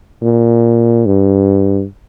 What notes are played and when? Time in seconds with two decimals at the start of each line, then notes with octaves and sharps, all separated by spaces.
0.22 A#2
1.06 G2